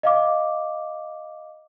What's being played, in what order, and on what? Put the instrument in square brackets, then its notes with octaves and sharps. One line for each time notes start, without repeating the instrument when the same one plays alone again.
[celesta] D#5 F5 D6